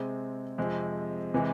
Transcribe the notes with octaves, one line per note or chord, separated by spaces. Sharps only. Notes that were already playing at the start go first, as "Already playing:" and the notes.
Already playing: C3 G#3 C4 G#4
F2 C3 G#3
C3 E3 G#3